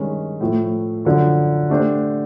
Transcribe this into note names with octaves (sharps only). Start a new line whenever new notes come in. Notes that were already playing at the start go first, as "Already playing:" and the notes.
Already playing: G2 D#3 G#3 C#4
A2 F3 A3
F#2 D3 F3
A3 D4 G4 C5